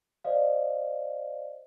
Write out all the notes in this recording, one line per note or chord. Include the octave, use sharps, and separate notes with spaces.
C5 D5 D#5 F5